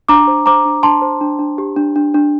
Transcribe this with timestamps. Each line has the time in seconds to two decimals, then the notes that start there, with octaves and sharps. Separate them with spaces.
0.09 D4 A#5 D6
0.27 C5
0.46 C5 A#5 D6
0.65 D4
0.83 D4 A5 C6
1.02 C5
1.21 D4
1.39 D4
1.58 G4
1.76 D4
1.96 D4
2.14 D4